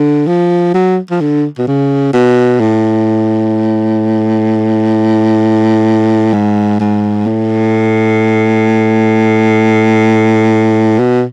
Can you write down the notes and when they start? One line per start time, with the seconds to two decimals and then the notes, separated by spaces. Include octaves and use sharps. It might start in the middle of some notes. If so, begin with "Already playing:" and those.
Already playing: D3
0.27 F3
0.74 F#3
1.11 F3
1.21 D3
1.58 B2
1.67 C#3
2.13 B2
2.60 A2
6.33 G#2
6.80 G#2
7.26 A2
10.99 B2